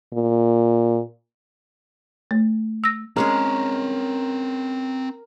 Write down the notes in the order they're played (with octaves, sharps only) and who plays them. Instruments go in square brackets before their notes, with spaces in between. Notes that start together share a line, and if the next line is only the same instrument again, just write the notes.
[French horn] A#2
[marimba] A3
E6 A#6
[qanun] G#3 C#4 G#4 [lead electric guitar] C4 C#5 [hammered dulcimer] A#4